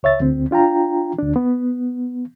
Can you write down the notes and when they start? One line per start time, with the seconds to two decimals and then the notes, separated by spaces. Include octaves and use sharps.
0.03 C#2 C#5 E5 A6
0.20 D2 C4
0.51 D4 F4 G5 A#5
1.19 D2 D4
1.36 B3